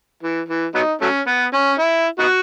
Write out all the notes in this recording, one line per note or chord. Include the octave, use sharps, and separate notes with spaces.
E3
E3
F#3 B3 D#4
F#3 A3 C#4
B3
C#4
E4
B3 D#4 F#4